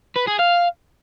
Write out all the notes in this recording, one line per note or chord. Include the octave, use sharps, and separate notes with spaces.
B4
G#4
F5